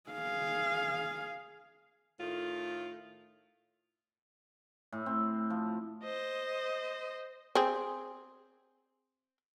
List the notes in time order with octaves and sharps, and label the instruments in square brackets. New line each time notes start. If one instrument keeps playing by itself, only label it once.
[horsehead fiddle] G#4 F5
[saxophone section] A2 D#3 A3 F4
[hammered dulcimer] A2
C4
F3
[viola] C5 D#5
[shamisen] C4 G#4